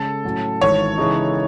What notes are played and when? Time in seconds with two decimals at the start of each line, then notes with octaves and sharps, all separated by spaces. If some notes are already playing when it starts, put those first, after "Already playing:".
Already playing: C#3 G#3 C#4 A4
0.24 A2 F#3 C#4
0.61 G#1 G#2 E3 C#5
0.98 C#3 E3 G#3 D#4